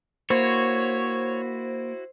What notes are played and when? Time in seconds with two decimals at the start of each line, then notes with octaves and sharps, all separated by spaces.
0.30 A#3 E4 F#4 C5 C#5